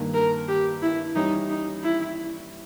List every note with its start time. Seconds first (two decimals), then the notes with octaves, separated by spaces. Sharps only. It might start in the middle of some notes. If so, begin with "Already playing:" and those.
Already playing: G2 D#3 A#3
0.14 A#4
0.48 G4
0.83 E4
1.15 E3 G3 C#4 D#4 G4
1.50 D#4
1.83 E4